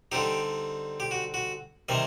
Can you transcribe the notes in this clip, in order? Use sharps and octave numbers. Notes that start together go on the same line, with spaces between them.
D3 G3 C4 D#4 G4
G4
F#4
F#4
C3 D#3 G3 A#3 D#5